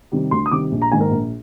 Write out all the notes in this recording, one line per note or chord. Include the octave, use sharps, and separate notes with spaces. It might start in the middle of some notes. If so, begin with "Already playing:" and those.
C3 D#3 G3
D2 C6
D#6
C3 D#3 G3 D6
A#1
A#5
G#2 D#3 A#3 G#5
A#4
A#1